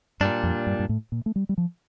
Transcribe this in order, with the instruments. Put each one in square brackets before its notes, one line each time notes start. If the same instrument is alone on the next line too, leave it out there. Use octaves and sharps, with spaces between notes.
[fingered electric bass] G2 [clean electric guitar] A#2 G3 D4
[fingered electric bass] F2
G2
G2
A2
A#2
A3
G3
G3
F3